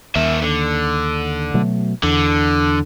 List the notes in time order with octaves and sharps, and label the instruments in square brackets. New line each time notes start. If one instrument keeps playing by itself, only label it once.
[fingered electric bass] D#2 [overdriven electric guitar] A#3 E5
[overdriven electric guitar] D3
[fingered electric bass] B2 F#3 A3
[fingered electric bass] E2 [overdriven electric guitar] D3